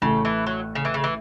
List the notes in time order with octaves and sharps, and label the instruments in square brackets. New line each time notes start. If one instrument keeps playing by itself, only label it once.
[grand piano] A1 A2 A3 [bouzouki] C#3
[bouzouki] E3
F#3
C#3
E3
C#3
E3